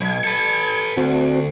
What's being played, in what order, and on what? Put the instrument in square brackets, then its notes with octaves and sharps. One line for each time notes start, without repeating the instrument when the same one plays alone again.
[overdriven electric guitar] B1 [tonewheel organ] G#6
[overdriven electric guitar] A4 B4
[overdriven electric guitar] D2 [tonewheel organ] C4 F#4